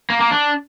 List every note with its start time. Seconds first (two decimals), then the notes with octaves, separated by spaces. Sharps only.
0.10 A#3
0.20 A#3
0.31 D4